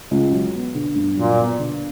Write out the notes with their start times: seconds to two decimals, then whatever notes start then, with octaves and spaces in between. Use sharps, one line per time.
0.11 C#2
0.32 F#3
0.54 B3
0.75 D3
0.95 G2
1.17 A#2 F#3
1.38 B3
1.59 D3